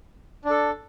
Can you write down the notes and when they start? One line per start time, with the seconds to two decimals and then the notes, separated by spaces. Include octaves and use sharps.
0.45 D4
0.50 A4